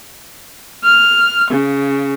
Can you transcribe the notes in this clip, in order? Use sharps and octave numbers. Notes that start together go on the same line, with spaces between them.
F6
C#3